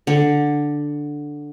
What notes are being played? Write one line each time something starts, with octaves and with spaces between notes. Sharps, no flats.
D3